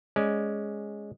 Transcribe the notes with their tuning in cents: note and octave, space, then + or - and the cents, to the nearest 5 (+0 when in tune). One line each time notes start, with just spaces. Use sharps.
G#3 +0 C#4 +0 D5 +0